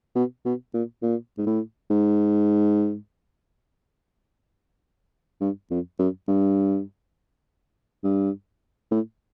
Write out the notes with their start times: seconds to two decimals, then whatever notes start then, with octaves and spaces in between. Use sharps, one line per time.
0.15 B2
0.45 B2
0.74 A#2
1.02 A#2
1.38 G#2
1.47 A2
1.91 G#2
5.41 G2
5.71 F2
5.99 F#2
6.28 G2
8.04 G2
8.91 A2